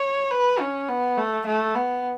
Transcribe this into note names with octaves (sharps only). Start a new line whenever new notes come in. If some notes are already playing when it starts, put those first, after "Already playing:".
Already playing: C#5
B4
C#4
B3
A3
A3
B3